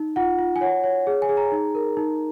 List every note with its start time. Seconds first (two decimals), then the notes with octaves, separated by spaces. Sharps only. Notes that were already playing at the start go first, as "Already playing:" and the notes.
Already playing: D#4
0.16 F4 F#5
0.39 F4
0.56 G#5
0.61 C#5 F#5
0.84 C#5
1.07 G#4
1.22 G#5
1.29 G#4
1.37 A#5
1.52 D#4
1.75 A#4
1.97 D#4